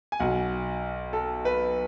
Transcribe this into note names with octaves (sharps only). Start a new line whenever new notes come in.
G#5
B1 B2 F#5
A4
B4